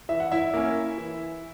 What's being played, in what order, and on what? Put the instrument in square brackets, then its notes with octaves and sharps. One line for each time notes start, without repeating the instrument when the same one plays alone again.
[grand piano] E3 E5
F#5
E4 E5
A#3 C#4
E3